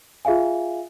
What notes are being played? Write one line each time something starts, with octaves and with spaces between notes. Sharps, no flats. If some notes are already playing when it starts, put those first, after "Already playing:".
F4 G#4 E5 F5 G#5